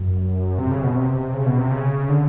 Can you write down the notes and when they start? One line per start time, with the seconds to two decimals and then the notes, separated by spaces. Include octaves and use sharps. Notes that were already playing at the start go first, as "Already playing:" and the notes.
Already playing: F#2
0.58 C3
0.71 C#3
0.83 B2
0.96 C3
1.34 C#3
1.46 B2
1.59 C3
1.71 C#3
2.09 D3